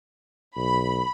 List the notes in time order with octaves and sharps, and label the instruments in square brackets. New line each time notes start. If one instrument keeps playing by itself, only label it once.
[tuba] B1 [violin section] B5